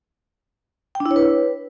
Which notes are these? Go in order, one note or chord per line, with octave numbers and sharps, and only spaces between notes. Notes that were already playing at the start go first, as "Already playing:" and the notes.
G5
D4
E4
C#5
B4